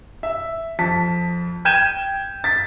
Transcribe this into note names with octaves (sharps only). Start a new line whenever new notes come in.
E5
F2 A5 B6
G5 G6 G#6 D#7 E7
A6 B6